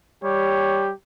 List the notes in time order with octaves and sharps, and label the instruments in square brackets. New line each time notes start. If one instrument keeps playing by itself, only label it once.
[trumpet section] G3 G4 C#5